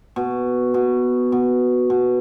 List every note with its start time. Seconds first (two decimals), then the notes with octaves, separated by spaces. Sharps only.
0.16 B2
0.74 B2
1.32 B2
1.90 B2